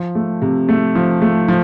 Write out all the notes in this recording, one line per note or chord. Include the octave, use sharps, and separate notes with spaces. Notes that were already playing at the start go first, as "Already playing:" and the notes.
Already playing: F3
A3
C3
A3
F3
A3
F3